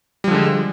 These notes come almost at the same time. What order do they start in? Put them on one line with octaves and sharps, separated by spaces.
G3 F3 D3 G#3